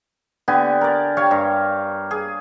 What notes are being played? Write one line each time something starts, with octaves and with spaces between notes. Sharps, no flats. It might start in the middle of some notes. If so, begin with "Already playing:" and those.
D3 B3 G4 G#5
A#4 D5
G4 C#5 F5 G#5
G2
G#4